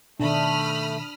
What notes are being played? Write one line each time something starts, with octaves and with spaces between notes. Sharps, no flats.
B2 D#3 A3 D4 B5 D#6 F6